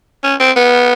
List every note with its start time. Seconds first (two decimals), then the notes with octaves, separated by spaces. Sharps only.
0.23 C#4
0.40 C4
0.56 B3